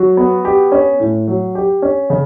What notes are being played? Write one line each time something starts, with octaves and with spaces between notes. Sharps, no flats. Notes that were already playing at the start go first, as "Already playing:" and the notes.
Already playing: F#3 F#4
B3
G4
C#4
A2
F#3
G4
C#4
C#3